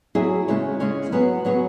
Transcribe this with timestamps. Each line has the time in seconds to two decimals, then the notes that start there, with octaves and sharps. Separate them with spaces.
0.15 F#3 E4 G#4 E5
0.48 C#3 G#3 C#4 E4 C#5
0.80 C#3 G#3 C#4 E4 C#5
1.12 F#3 B3 G#4 C#5
1.45 F#3 B3 G#4 C#5